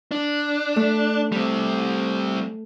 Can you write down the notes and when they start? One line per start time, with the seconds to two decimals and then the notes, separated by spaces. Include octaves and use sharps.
0.11 D4
0.76 A3
1.32 G3 C4